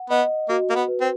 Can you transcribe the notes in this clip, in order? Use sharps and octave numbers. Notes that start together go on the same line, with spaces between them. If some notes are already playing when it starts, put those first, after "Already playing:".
Already playing: F#5
B3 D#5
A#3 F#4
A#3
B3
B4
C4